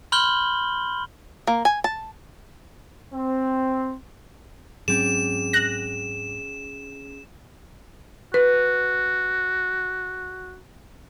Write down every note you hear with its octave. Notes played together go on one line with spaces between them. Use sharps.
B5 C6 F6 G6 F#7 G7
A#3
G#5
A5
C4
G#2 F#3 C4 C#4 G#4 E7
F#6 A#6
F#4 B4